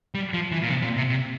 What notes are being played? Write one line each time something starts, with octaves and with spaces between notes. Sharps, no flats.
G3
F3
E3
A#2
C3
A#2
C3
C3